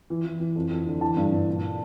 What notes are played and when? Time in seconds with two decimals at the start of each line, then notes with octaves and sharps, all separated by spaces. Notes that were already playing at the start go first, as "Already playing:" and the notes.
0.10 E3
0.25 E3
0.40 E3
0.56 F2
0.70 F2
0.87 D3
1.01 E3 A5
1.17 G2
1.32 G2
1.47 A#2